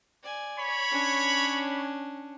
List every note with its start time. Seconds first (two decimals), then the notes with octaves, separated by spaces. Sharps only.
0.23 D5 G#5
0.58 C#5 B5
0.91 C#4 D4